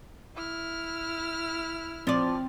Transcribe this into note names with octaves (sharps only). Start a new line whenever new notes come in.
E4 F6
F3 C4 D5